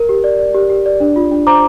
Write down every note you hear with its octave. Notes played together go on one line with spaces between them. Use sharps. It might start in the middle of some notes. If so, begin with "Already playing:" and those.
Already playing: A#4
G4
D5
D5
G4
G4
D5
D4
F4
D4
C5 A#5 D6